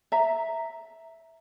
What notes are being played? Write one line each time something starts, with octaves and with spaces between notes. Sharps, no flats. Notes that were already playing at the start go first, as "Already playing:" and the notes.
E5 A#5